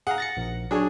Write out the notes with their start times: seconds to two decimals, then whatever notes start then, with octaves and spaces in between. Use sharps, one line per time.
0.07 G#4 F5 F#5 A#5
0.18 A6 A#6 C#7
0.37 A#1
0.71 F#3 D4 G#4 C#5